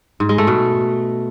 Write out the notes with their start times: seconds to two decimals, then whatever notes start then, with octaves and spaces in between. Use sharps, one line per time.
0.20 G#2
0.29 G#3
0.38 A3
0.47 B2